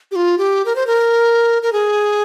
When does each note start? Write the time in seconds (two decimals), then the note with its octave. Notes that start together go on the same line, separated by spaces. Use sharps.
0.11 G4
0.16 F4
0.38 G4
0.66 A#4
0.76 C5
0.87 A#4
1.63 A#4
1.73 G#4